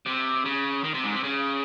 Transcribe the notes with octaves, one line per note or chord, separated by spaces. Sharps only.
C3
C#3
D#3
C3
G#2
C3
C#3